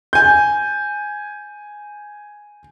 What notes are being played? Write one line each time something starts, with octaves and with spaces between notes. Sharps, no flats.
G#5 G6